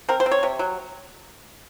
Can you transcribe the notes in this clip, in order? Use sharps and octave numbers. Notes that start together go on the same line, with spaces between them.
C4 A#4
C5
C4
C#5
C3
F#3